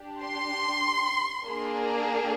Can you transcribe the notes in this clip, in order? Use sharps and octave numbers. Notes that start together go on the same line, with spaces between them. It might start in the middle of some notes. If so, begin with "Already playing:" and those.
Already playing: D4 G4
C6
A#3 D4 G#4